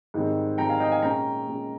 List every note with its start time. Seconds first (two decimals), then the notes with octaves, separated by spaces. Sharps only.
0.14 G#2 D#3 G3 C4
0.58 G#2 D#3 G3 C4 G5 A#5
0.69 F5 G#5
0.80 D#5 G5
0.92 F5 G#5
1.03 A#2 G#3 C#4 G5 A#5
1.47 A#2 G#3 C#4